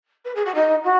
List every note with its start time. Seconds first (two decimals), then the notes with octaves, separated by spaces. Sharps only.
0.25 B4
0.35 G#4
0.46 F#4
0.55 D#4
0.84 F#4